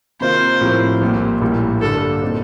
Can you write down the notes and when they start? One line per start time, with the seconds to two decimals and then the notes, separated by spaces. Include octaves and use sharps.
0.21 C3 D#3 A#3 F4 A#4 C5
0.61 A2 F3 C4 G4 A#4
1.01 A#1 A#2 G3 A#3
1.41 A#1 A2 G3 A#3
1.81 G2 D3 G3 A#3 D4 A4
2.22 A#2 G3 C4 D#4 A4